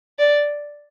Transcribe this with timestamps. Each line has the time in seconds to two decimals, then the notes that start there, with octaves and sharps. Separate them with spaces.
0.19 D5